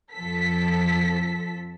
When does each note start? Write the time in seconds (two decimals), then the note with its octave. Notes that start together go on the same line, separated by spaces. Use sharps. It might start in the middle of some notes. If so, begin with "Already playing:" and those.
0.14 F2 F3 A4 B6